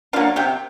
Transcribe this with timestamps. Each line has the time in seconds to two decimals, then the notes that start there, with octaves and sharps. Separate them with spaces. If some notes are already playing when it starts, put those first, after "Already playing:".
0.13 D4 F4 F5
0.16 F#3 A#3
0.36 C3 G4 G5